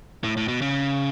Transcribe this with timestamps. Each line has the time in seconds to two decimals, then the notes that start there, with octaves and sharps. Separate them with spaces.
0.24 A2
0.37 A2
0.48 B2
0.62 C#3